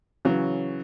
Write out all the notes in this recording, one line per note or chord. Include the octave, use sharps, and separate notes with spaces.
C#3 E3 F#3